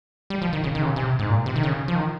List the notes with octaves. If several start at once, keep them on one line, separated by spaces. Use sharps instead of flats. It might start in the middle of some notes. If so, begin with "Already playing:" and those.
G3
F3
D#3
C#3
D#3
C3
C#3
C3
G#2
A#2
C3
D#3
C#3
F3
D#3